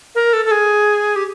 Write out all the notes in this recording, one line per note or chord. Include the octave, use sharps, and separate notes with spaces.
A#4
A4
A4
G#4
G4